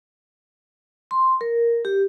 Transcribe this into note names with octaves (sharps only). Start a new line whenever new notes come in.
C6
A#4
G4